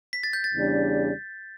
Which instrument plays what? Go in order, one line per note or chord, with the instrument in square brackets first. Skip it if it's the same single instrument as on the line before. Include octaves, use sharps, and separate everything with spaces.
[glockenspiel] B6
A6
G6
A6
[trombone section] E2 C#3 G3 D4